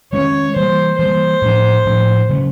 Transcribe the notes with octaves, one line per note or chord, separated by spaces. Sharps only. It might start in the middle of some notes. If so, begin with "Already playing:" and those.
D#3 G#3 C#4 C#5
E3 G3 A#3 C5
E3 G3 A#3 C5
A2 F3 A3 D4
A2 F3 A3 D4
C#3 F#3 A3